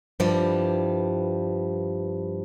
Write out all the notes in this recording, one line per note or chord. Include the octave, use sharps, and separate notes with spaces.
G2 E3 F3 G3